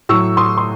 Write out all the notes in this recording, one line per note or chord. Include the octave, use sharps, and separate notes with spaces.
A2 F#3 C#6 E6
C6 D#6
C6